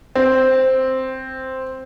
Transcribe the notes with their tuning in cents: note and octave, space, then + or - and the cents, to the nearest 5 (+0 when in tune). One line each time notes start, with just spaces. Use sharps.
C4 +0